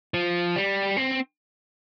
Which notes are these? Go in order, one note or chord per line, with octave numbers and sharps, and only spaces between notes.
F3
G3
C4